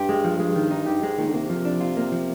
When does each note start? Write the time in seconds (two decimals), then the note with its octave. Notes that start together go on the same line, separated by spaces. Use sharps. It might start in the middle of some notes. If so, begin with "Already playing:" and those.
Already playing: G2 G4
0.09 G#3
0.24 F3
0.39 G#3
0.56 D#3
0.71 D#4
0.86 G2 G4
1.03 G#2 G#3
1.18 A#2 D#3
1.28 D3
1.34 C3 A#3
1.50 F3
1.65 D4
1.81 F4
1.97 A#3
2.12 F3